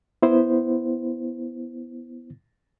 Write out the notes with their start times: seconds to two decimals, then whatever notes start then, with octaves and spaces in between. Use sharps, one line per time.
0.22 B3 E4 C5